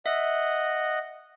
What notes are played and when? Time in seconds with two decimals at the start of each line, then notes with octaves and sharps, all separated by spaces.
0.06 D#5 E5 F#5